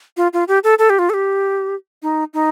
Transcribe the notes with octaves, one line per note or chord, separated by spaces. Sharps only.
F4
F4
G4
A4
A4
G4
F4
A4
G4
D#4
D#4